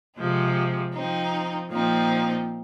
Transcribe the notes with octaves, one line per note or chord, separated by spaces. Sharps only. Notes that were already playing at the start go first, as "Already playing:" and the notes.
C3 F3 G#3
F3 C4 D#4
A#2 F3 C4 D#4